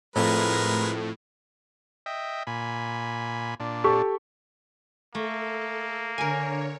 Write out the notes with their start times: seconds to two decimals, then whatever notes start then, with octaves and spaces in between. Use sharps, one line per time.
0.16 F2 A2 G#3 A#4 B4
2.06 D#5 E5 G5
2.47 A#2 G#5 B5
3.60 A#2 D4
3.84 G4 A4 C#6
5.15 A3 A#3 A4
6.18 D3 A#4 C#5 G#5